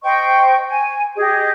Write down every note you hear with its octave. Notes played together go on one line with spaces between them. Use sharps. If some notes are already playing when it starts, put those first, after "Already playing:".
C5 D#5 G5 C#6
G#5
G4 G#4 D#5